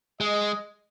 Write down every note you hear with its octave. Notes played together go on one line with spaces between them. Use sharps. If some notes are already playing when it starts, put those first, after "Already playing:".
G#3 D#5